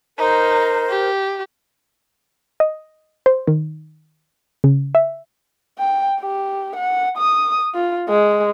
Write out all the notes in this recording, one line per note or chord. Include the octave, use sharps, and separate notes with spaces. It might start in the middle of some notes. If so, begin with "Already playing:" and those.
D#4 A#4 C5
G4
D#5
C5
D#3
C#3
E5
G5
G4
F#5
D#6
F4
G#3